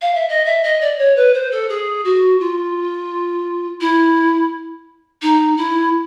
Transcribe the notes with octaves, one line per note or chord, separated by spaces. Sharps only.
F5
E5
D#5
E5
D#5
D5
C#5
B4
C5
A4
G#4
F#4
F4
E4
D#4
E4